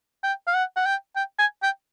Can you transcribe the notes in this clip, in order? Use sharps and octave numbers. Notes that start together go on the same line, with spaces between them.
G5
F5
F#5
F#5
G5
G5
G#5
G5